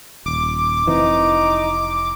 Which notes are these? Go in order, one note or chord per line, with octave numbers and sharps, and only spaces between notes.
D#1 D6
F1 E3 C4 D#4